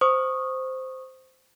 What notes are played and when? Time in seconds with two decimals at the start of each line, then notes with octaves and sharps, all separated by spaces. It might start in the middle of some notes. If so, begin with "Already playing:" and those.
0.01 C5 C#6 D#6